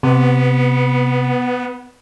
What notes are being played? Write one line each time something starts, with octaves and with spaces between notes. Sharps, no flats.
C3 B3